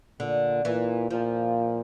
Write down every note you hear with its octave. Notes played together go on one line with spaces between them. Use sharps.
A#2 D3
A#2 E3
A#2 F3